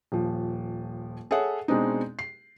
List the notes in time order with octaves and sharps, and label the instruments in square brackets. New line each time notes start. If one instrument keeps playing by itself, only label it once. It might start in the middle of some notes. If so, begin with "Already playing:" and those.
[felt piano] D#1 F3
G#4 A4 C#5 E5 F#5
B2 G#3 C4 D4 D#4
C7